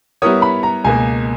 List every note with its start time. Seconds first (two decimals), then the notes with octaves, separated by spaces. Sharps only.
0.22 G3 B3 E4 A#4 C#5 D#6
0.42 B5
0.63 A#5
0.84 C#2 B2 A#3 G#5